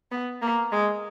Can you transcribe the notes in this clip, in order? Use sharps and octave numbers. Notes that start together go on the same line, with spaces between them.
B3
A#3
G#3